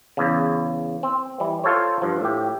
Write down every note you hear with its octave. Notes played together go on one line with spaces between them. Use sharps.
E2 C#3
C4
E3 G3
F4 A4 C5 C#5
G2 F3
A2 G4